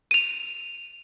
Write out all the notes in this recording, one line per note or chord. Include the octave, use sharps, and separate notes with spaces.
D#7 F7